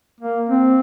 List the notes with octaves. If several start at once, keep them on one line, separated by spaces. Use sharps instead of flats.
A#3
C4